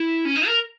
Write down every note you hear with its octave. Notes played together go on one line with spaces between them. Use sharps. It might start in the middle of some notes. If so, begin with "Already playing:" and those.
Already playing: E4
C#4
D#4
A#4